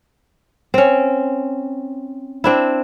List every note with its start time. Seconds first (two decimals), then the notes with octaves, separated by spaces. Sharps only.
0.74 C4 C#4
2.44 C4 D4 E4